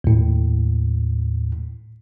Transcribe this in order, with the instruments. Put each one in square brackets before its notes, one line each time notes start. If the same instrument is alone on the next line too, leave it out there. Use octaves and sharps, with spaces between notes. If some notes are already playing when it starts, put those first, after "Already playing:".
[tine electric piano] D#2 A2